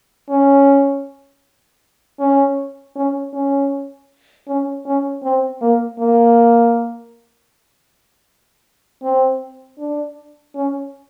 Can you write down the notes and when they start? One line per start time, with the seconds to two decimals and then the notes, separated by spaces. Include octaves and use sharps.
0.29 C#4
2.20 C#4
2.96 C#4
3.33 C#4
4.47 C#4
4.86 C#4
5.23 C4
5.61 A#3
5.99 A#3
9.03 C4
9.78 D4
10.55 C#4